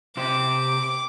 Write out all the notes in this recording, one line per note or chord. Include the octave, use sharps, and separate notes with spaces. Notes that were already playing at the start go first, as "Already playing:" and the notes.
C3 C5 D6